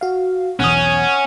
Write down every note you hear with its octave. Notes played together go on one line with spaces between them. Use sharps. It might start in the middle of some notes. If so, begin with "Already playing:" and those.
F#4 F5
B1 E2 C#4 F#5 D#6